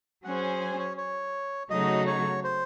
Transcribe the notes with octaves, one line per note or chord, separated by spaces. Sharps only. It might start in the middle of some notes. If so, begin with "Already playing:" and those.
F#3 C#4 G#4 C5 F#5
G#5
G#5
C#5
C#5
C#3 F#3 A3 D#4 F#4 D#5
C#5
C5